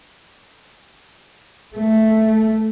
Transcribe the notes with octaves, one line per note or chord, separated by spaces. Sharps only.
A3